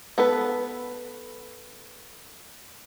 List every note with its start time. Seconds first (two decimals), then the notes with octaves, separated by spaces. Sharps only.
0.18 B3 A4 B4